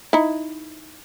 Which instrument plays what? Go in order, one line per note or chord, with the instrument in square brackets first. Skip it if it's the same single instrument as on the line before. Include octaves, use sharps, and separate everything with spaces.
[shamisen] D#4 E4